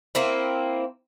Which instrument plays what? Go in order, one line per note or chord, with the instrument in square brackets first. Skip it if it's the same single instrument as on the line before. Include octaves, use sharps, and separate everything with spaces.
[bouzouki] A#3 C4 E4